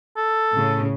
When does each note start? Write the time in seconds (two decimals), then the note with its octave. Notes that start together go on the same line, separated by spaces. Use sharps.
0.17 A4
0.54 A2 C#3